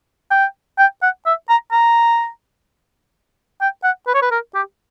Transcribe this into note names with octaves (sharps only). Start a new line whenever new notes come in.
G5
G5
F#5
E5
A#5
A#5
G5
F#5
B4
C#5
B4
A#4
G4